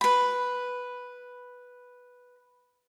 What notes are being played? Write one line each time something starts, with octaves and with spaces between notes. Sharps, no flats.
B4 B5